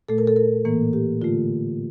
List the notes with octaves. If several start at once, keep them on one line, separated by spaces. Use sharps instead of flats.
A#2 A3 A4
A#4
A4
A#4
A2 E3 A#3
G4
D3 A3 F4